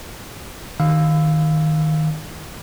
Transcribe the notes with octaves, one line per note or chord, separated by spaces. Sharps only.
D#3 F5 E6